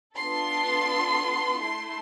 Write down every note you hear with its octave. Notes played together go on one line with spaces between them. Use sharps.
B3 D4 F4 A4 C6
A3 E4 A4 C6